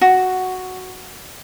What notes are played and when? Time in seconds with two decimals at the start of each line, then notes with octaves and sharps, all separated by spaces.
0.01 F#4